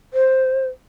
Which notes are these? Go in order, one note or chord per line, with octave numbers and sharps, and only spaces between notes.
C5